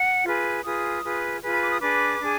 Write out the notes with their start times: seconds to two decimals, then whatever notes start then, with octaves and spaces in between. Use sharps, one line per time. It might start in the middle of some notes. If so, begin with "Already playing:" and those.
Already playing: F#5
0.25 F4 G#4 B4
0.64 F4 G#4 B4 D#6
1.03 F4 G#4 B4
1.42 F4 G#4 B4
1.52 B5
1.61 D6
1.71 D#6
1.81 D4 G#4 B4 D6
2.20 D4 G#4